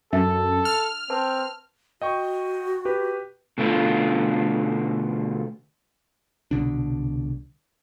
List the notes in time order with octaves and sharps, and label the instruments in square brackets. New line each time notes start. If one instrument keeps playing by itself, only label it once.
[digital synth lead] F#2 [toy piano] D4 E5 [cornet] A4
[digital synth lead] F6
[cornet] C4 [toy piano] B4 A5
[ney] F#4 [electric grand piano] D#5 G5 C#6
[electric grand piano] G4 B4
[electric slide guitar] B2 D3 A3 F4
[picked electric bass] C2 B2 D3 D4